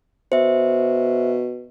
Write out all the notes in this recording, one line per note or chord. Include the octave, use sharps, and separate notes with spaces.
B2 C5 E5